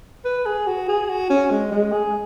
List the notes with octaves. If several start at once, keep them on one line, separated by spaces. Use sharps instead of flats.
B4
G#4
F#4
G#4
F#4
C#4
G#3
G#3
G#4